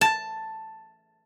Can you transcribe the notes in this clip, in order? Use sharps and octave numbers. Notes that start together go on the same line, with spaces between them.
A5